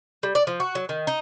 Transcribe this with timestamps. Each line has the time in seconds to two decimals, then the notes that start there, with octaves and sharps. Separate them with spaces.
0.23 G3
0.35 D5
0.47 F3
0.60 F#4
0.75 F#3
0.89 D#3
1.07 D#4